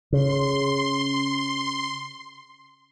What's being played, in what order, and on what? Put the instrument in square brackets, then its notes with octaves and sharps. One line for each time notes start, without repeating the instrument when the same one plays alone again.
[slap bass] C#3 [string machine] C6